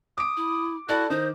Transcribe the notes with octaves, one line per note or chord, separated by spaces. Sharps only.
D6 D#6 D7
E4
E4 F#4 A4 D5 A5
D#3 D#4 C5